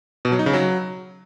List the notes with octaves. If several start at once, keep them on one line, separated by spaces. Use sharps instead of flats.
B2
F#3
D#4
C#3
F#3